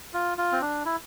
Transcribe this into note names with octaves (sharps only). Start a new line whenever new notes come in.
F4
F4
C4
D4
E4